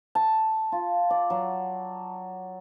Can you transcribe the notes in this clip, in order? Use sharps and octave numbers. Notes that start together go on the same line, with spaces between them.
A5
F4
D5
F#3